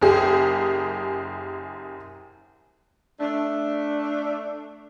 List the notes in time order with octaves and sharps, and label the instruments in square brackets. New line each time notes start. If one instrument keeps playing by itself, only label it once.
[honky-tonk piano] F#1 F#2 G4 G#4
[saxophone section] A3 D4